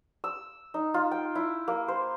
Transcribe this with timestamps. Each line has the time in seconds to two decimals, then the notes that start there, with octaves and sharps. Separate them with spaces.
0.24 E6
0.74 D#4
0.94 F4
1.11 G5
1.35 E4
1.68 A#3
1.88 C5